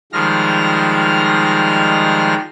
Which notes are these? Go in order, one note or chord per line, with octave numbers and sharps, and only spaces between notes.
D#3 F3 G3 G#3 F6 A#6